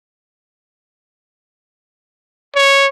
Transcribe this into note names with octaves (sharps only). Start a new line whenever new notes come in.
C#5